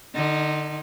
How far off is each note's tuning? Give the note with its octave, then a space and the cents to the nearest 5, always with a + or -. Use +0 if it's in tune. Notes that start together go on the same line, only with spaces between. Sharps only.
D3 +35 D#4 +5